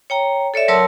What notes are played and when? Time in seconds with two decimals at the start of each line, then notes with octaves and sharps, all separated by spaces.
0.10 C#5 G5 A#5
0.54 A4 C#5 D5 E5
0.68 F#3 A#4 C#5 A5 C6 E6